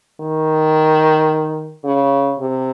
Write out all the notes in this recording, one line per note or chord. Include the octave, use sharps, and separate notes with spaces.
D#3
C#3
C3